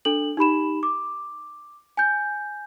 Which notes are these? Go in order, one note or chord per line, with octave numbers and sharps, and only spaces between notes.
D4 A4 F#7
D#4 G4 B5 E7
D6
G#5 G6